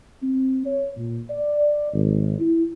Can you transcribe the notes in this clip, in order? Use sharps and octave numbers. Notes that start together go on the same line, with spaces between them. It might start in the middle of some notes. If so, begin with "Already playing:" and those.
C4
C#5
A#2
D5
G#1
E4